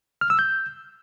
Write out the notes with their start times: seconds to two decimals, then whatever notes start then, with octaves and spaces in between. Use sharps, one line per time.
0.21 F6
0.30 E6
0.39 G6